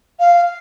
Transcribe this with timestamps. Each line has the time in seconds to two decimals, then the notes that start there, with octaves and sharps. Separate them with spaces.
0.19 F5